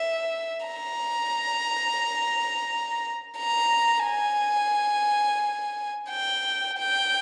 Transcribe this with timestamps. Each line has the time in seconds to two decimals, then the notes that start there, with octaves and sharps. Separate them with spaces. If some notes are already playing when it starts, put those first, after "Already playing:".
Already playing: E5
0.66 A#5
3.38 A#5
4.06 G#5
6.10 G5
6.78 G5